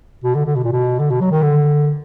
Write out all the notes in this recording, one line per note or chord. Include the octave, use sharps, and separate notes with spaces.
B2
D3
D3
B2
A#2
B2
D3
B2
F#3
D#3
D3